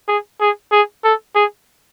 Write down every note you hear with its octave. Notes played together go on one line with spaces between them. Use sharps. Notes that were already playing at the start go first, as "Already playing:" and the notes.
G#4
G#4
G#4
A4
G#4